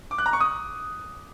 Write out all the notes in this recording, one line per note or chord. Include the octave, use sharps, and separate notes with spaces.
D6
F#6
A#5
C#6
D#6